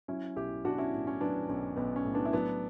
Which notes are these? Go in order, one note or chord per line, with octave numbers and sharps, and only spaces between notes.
F#3 C#4 E4
B1 E4 G4
B1 D4 F#4
C#4 E4
A2
C#4
F#3 B3 D4
B1 C#4
B1 B3
C#4
A2
B3 D4
E4
F#3 B3 D4